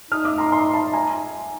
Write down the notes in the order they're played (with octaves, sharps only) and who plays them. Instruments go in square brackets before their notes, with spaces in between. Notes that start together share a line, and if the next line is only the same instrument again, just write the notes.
[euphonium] D#4 [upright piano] D#6 F6
[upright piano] D6 E6
A#5 C6
A#5 C6
A5 B5
G#5 A#5